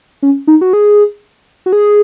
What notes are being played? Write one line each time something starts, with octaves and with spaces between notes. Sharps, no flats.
C#4
D#4
F#4
G#4
F#4
G#4